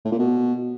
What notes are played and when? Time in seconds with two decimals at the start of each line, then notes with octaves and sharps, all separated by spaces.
0.05 A2
0.12 A#2
0.19 B2